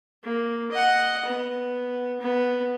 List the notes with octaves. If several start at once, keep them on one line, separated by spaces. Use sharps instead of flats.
A#3
D#5 F#5
B3
B3